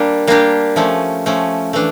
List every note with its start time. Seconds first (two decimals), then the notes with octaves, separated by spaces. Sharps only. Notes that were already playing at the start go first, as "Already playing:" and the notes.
Already playing: G3 A#3 D4 G4
0.27 G3 A#3 D4 G4
0.76 F3 A3 C#4
1.26 F3 A3 C#4
1.73 E3 A3 D4